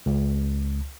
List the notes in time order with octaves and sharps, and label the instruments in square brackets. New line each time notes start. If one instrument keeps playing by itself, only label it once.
[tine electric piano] C#2